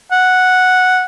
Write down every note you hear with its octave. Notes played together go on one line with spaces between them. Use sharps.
F#5